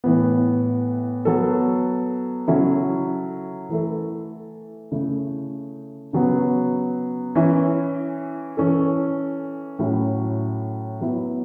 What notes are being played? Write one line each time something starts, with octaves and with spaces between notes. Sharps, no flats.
A2 E3 B3
F#3 B3 A4
C#3 F#3 C#4 E4 A4
E3 A3 E4 A4
C#3 A3 E4
C#3 F#3 B3
E3 C#4 E4
E3 C#4 A4
A2 F#3 C#4 E4
F#3 B3 E4